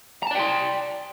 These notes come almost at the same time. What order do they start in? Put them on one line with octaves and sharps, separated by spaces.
A#5 A5 D5 G5 C6